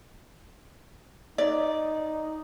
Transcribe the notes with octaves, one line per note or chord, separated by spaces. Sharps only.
D#4 D5